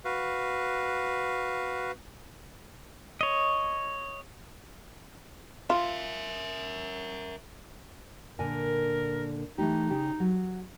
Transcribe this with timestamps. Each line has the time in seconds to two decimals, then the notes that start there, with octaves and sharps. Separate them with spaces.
0.05 F#4 B4 F5
3.21 C#5 D#5
5.70 F4 A#4 E5
8.39 A#2 D3 A#4 G#5
9.58 E3 A3 D#4 G4
9.90 C#3 G4
10.20 F#3